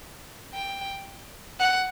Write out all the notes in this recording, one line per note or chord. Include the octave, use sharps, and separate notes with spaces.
G5
F#5